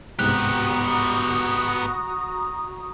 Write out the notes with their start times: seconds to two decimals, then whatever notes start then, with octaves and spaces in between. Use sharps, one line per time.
0.19 C2 G#2 B3 F#4 G4 A#5 D#6 F#6